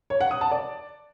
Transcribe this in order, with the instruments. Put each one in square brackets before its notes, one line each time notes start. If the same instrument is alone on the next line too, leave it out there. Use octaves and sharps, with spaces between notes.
[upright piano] C#5
F#5
D#6
A5
D5